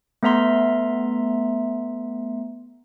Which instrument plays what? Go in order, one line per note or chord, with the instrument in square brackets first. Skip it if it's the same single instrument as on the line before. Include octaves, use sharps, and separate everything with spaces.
[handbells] A3 B3 E5 A#5 C6